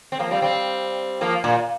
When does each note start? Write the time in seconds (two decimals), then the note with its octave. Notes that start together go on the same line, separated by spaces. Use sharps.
0.12 C4
0.19 F3 A#3
0.31 G3 C4
0.42 G3 C4
1.21 F3 A#3
1.44 A#2